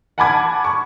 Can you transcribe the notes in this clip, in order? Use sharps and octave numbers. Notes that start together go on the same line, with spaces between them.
F#5 G#5 A5 B5 D6 G#6
C#6